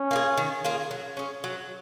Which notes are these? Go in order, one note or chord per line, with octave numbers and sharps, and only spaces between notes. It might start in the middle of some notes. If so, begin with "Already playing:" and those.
Already playing: C#4
A#3 F4 G#4
D#3
A#3 F4 G#4
F#3
C#4 G#4
F#3